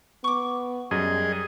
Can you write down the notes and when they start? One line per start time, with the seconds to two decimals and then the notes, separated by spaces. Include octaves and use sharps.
0.24 B3 C#6 D6
0.91 F#2 G3 G#4 D#5